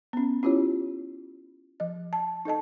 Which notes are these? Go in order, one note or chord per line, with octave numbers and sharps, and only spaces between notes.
B3 C#4
C#4 E4 F4 G4 C#5
F3 D#5
A5
D#4 A4 D#5 A5